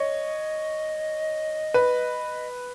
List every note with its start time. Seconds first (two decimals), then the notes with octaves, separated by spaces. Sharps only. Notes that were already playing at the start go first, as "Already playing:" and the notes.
Already playing: C#5 D#5
1.74 B4